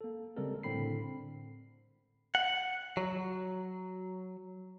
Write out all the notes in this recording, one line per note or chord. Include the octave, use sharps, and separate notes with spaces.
A#3 A4
C#3 G3 G#3 C4 A4 A#4
A2 D3 C4 B5 C7
F#5
F#3